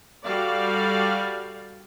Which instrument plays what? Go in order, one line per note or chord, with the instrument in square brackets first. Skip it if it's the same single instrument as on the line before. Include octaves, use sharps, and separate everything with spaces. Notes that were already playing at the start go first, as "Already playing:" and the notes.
[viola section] G3 F#4 A4 D5 F5